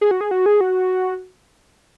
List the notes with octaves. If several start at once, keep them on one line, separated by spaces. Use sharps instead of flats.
G#4
F#4
G#4
F#4
G#4
F#4